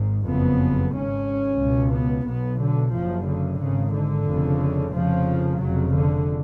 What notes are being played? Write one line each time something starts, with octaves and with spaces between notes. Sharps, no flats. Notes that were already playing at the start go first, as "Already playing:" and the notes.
Already playing: G#1 G#2
F#1 F2 C#3 B3
G#1 G#2 C#4
C#2 B2
B3
B1 B2 B3
D3
F#1 F#2 C#3 F3
D3
G#1 G#2 C#3
D3
F1 F2 C#3
F1 F2 C#3 F3
F1 F2 C#3 F#3
D3